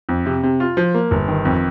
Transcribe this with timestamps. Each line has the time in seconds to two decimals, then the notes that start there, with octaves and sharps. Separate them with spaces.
0.09 F2
0.26 C3
0.43 C3
0.60 F4
0.77 F3
0.95 A#3
1.11 G1
1.28 D#3
1.45 F2